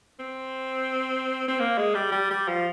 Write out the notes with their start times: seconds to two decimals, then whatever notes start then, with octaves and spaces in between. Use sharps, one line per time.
0.19 C4
1.48 C4
1.59 A#3
1.78 G#3
1.95 G3
2.12 G3
2.30 G3
2.48 F3